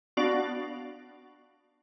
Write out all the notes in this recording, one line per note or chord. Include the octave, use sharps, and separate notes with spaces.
B3 D4 F#4 D5 F5